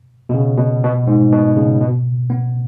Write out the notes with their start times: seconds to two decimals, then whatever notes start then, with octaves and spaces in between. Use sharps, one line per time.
0.29 B2
0.34 C#3
0.58 B2
0.83 B2
1.07 G#2
1.32 B2
1.57 C#3
1.81 B2
2.30 B3